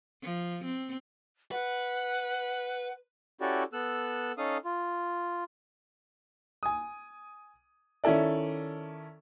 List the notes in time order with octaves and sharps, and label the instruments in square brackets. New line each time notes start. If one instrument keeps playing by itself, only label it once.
[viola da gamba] F3
C4
[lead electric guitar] B4 [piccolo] F#5
[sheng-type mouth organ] C#4 E4 F#4 G4 A4 D5
B3 A4 E6 F#6
C#4 D#4 A4 F5 D#6
F4
[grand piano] G#5 D#6
D#3 C#4 E4 A4 D5